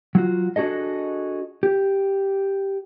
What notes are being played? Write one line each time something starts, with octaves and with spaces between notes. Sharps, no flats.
F#3 F4 F#4
D4 F#4 G#4 A4 D#5
G4